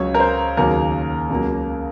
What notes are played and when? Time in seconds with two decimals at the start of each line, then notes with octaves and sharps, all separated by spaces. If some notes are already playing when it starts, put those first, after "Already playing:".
Already playing: C#2 C#3 F#3 C#5
0.14 A#4
0.20 C5
0.57 D#2 C#3 F#3 A#3 A#4
1.30 C#2 C#3 F#3 A#3